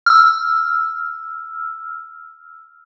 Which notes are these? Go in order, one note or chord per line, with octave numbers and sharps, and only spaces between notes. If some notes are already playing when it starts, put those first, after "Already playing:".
E6 F6